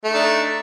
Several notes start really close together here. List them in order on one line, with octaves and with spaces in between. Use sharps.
A3 D#4 D4